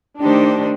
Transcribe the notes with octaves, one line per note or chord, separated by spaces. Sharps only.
D#3 A3 D4 D#4 G4 C5